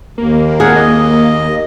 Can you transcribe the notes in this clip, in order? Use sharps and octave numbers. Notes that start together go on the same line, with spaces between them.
D#2 A#3
G#4 A#4 F#5
D#5